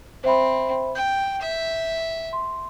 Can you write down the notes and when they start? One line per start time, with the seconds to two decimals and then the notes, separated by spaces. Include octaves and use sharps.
0.24 C4 C5 E5 B5
0.95 G5 G6
1.42 E5
2.33 C6